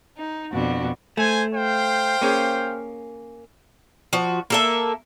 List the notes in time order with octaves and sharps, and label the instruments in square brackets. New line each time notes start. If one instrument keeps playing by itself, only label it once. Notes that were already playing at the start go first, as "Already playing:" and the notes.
[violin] D#4
[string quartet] F2 B2 [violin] D4 F#4
[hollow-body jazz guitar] A3 [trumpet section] C5 G#5
[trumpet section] C5 F5 G5
[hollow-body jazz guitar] A#3 C#4 G#4
[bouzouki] F3 F#4
A#3 A4 E5